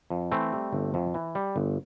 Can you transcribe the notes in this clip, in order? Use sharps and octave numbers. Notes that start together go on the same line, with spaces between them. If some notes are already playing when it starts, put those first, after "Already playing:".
F2
E3 A3 C4
G3
G1
F2
E3
G3
G1